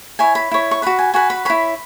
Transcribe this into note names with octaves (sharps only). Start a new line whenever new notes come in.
E4 C#5 G#5
B5
E4 C#5
C#6
F#4 B4 B5
G#5
F#4 B4 G#5
B5
E4 C#5 B5